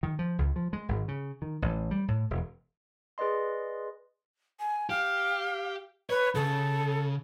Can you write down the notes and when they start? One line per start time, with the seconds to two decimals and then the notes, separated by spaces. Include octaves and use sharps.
0.03 D#3
0.19 F3
0.38 C#2
0.56 F3
0.73 G#3
0.89 G#1
1.08 C#3
1.42 D#3
1.62 A1
1.91 G3
2.08 A2
2.30 E1
3.18 G#4 B4 D5 D#5 C6
4.60 G#5
4.90 G4 F5
6.10 B4 C#5
6.35 C#3 A4